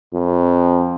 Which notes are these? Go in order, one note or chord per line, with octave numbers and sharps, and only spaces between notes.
F2